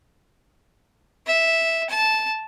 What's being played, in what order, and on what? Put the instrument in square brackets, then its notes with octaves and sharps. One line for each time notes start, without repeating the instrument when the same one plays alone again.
[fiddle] E5
A5